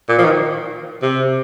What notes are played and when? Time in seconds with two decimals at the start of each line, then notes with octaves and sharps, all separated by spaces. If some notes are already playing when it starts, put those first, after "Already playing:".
0.09 A#2
0.18 F3
0.25 D#3
1.02 C3